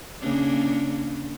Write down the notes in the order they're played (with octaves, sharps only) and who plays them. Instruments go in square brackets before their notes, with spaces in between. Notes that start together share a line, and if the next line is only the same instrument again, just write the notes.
[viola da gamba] C#3 A#3 D4